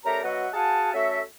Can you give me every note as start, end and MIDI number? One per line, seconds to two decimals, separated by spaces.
0.05 0.21 57
0.05 0.21 61
0.05 0.21 67
0.05 0.21 70
0.05 0.21 74
0.05 0.21 82
0.24 0.49 54
0.24 0.49 59
0.24 0.49 66
0.24 0.49 75
0.24 0.49 76
0.24 0.49 78
0.54 0.94 66
0.54 0.94 68
0.54 0.94 77
0.54 0.94 78
0.54 0.94 80
0.54 0.94 81
0.94 1.21 57
0.94 1.21 61
0.94 1.21 66
0.94 1.21 69
0.94 1.21 73
0.94 1.21 76